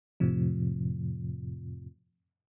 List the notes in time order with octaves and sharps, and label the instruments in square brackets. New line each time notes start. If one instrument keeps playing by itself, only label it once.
[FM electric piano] F2 A2 C3 F3